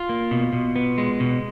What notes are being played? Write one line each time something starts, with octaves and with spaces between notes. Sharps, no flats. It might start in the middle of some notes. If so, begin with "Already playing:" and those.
Already playing: F4
A#3
B2
B2
B3
G#3
B2